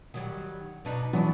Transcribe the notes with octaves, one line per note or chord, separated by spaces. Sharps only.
D#3 F#3 G3
B2 D4 D#4
E3 F#3 B3 D4